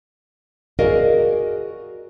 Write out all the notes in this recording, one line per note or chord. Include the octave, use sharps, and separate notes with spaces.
F#4 G#4 A#4 D5 D#5 F5